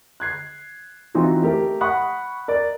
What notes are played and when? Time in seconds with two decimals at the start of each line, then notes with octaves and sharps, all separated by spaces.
0.20 F#6 G#6 C7
1.14 E3 C4 D#4 F4 F#4
1.42 A3 G4 A#4
1.81 F#5 B5 C#6 D#6 F#6
2.48 A#4 D5